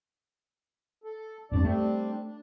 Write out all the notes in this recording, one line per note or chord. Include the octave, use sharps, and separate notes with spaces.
A4
E2 G2 C4 D4 D5
G3 A3 C4 D4
D4